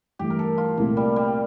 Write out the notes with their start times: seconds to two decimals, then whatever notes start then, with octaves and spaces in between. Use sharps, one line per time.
0.19 G2 E3 A3 G4
0.30 A#4
0.39 A4
0.58 F4
0.77 C2 A#2 A3 A#3 E4
0.97 G3
1.16 G3